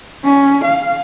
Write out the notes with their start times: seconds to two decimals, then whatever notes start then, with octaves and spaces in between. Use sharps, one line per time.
0.24 C#4
0.64 F5